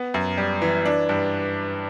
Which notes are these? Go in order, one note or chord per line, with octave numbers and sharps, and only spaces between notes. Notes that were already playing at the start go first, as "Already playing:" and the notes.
Already playing: B3
F#2
G3
E3
D4
G2